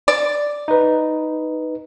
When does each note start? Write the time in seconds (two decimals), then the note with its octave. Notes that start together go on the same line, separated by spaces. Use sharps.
0.08 D5
0.68 D#4 B4